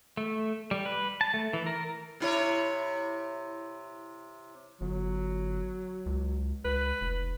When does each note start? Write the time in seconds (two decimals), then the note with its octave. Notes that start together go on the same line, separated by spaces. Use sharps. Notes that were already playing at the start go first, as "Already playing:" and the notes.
0.17 A3
0.71 G3
0.86 B4
1.21 A5
1.34 A3
1.53 E3
1.66 A#4
2.20 C3 E4 C#5
4.81 G1 F#3
6.06 C#2
6.65 C#2 B4
7.01 F1